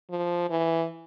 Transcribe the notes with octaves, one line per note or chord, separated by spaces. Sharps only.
F3
E3